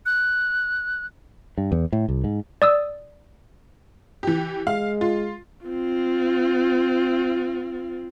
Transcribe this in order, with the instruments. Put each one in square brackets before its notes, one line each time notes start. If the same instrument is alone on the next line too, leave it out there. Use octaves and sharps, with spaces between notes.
[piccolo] F#6
[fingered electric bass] G2
E2
A2
C2
G#2
[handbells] D5 D#6 E6
[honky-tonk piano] E3 G4
[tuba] G#3 [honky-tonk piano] F5
[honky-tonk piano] F4
[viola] C4 F4